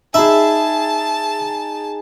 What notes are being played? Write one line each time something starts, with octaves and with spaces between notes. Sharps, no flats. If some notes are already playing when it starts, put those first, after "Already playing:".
D#4 G#4 E5 A5 B5